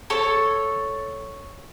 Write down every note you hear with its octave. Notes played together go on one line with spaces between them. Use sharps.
A4 C#5